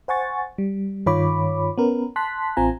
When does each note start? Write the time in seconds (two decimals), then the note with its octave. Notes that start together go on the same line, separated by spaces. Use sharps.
0.08 C5 F#5 G#5 C#6 A6
0.58 G3
1.06 G2 D#3 F4 C#5 B5 D6
1.78 B3 C#4 A#4 B4
2.16 A5 C6 F#6 B6
2.57 A1 C4 F4 G#5 A#5